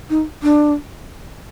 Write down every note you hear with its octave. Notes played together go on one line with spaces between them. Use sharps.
D#4
D4